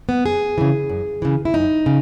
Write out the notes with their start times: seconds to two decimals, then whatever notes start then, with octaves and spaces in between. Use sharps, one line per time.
0.09 B3
0.24 F#2 G#4
0.58 C#3 E3
0.89 F#2
1.22 C#3 E3
1.45 E4
1.54 F#2 D#4
1.86 C#3